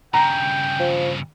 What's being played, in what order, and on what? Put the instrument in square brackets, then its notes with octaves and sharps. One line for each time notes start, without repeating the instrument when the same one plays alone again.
[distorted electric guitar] G2 C#3 [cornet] G5 [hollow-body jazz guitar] A#5
[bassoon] F3